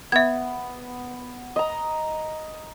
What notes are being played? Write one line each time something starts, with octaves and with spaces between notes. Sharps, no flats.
B3 E5 G#6
D#5 A#5